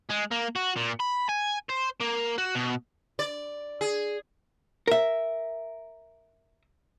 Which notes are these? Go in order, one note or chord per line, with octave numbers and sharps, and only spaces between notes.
G#3
A#3
F#4
A#2
B5
G#5
C5
A#3
F#4
B2
D5
G#4
A#4 E5